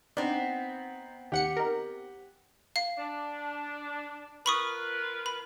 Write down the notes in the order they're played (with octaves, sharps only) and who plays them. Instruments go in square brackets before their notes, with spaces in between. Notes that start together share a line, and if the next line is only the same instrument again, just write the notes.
[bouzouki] B3 C4 [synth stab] D4 [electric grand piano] D#4
[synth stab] D#2 C#7 [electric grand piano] G4 F#5
[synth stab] D#4 A#4
[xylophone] F5 C7
[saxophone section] D4
[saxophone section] F4 A#4 B4 [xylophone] B5 C#6 D#6
[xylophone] B5